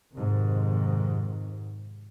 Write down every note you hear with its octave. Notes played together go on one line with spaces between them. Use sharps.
F2 G#2 C3 D#3